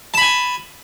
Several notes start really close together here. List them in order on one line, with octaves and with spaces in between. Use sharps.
A5 B5 G#5